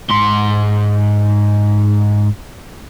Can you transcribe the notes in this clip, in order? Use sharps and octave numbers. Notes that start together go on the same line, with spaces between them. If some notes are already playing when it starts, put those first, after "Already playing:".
G#2 C6